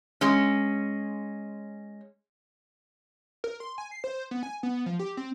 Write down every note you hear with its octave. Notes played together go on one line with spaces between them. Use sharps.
G#3 C#4
A#4
C6
G#5
C7
C5
B3
G#5
B3
F3
G4
C4